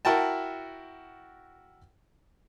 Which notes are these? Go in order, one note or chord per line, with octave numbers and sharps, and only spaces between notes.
E4 F#4 A#4 G5 A5